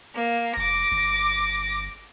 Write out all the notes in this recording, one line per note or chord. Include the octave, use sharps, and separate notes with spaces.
A#3
F1 D6 A#6
G1